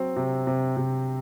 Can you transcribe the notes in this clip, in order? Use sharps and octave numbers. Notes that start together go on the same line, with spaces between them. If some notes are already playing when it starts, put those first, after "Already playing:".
Already playing: F#3 C4
C3
C3
C3